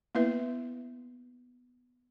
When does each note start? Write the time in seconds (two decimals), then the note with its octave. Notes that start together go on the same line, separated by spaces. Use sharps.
0.15 A#3 B3 E4 B4 E5